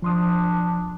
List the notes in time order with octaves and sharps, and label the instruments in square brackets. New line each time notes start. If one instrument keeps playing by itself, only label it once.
[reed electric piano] F3 C6 D#6 [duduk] D4